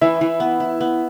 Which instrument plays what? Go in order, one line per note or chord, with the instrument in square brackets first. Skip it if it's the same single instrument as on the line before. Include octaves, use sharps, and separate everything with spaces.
[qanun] E3 [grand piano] E4 E5
[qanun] E3
B3
E4
B3